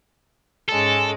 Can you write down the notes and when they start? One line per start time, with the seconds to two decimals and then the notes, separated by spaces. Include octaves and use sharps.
0.69 G#2 G#3 C#4 A4